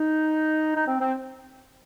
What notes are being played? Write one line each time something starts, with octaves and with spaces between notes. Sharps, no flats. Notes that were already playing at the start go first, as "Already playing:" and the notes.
Already playing: D#4
D#4
C4
C4